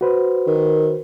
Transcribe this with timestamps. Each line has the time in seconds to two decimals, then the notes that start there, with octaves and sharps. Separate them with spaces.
0.01 F#4 B4 C5
0.47 D#3